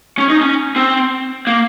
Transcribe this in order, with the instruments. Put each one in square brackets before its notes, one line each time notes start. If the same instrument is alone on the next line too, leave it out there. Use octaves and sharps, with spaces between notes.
[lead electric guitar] C#4
D#4
C#4
C4
A#3